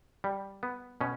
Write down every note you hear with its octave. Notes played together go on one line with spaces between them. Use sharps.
G3
B3
B2 C#4